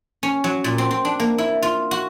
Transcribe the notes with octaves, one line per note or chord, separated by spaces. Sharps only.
C#4
F#3
A#2
C4
C4
D4
A#3
E4
F4
F#4